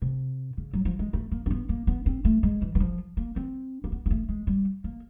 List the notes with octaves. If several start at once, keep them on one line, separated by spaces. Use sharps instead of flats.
C3
C#3
F#3
F3
G#3
A3
A#3
C4
B3
A#3
B3
C4
A3
G#3
E3
E3
F3
A#3
C4
A#3
B3
A#3
A3
G#3
G3
A#3